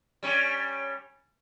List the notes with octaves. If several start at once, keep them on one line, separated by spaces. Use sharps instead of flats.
G3 C#4